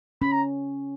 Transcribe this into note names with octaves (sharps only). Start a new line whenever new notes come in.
C#4 B5
A#5